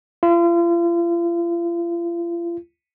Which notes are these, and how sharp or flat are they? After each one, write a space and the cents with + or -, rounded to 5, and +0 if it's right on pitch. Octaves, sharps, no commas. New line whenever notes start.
F4 -40